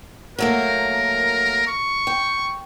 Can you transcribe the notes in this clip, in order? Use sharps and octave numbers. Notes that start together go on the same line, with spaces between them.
F#3 A3 A#3 A#4
C#6
G5